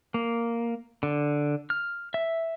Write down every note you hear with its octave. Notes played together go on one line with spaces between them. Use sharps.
A#3
D3
F6
E5